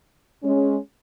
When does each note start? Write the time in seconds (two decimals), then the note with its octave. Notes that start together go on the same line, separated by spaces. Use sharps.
0.43 G#3 C#4